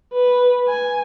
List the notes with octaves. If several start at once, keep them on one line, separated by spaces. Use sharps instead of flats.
B4
G#5